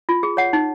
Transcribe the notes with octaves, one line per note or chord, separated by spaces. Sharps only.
F4
G#4
C#5 F#5
D#4